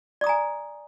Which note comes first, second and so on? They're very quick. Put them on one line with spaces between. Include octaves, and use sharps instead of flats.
D5 D#6 A#5 G#5